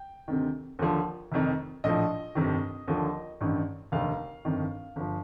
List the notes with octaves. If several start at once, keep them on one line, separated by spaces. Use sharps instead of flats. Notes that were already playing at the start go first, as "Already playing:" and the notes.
Already playing: G5
D2 C3 D#3
D#2 D3 F3
F1 F2 D#3
A#1 A2 F3 D#5
G1 F2 C3 D#3
D#2 D3 F3
A1 G2 D#3
F1 D#2 D3 F5
G1 F2 D#3
G1 F3